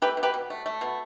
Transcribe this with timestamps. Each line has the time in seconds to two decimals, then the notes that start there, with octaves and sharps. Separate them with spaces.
0.02 A3 G4 B4
0.17 B2
0.23 G4 B4
0.34 B2
0.50 A3
0.66 A3
0.81 B2